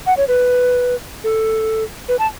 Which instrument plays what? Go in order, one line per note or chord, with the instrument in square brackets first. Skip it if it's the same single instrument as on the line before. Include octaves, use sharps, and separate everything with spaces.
[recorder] F#5
C#5
B4
A4
B4
A5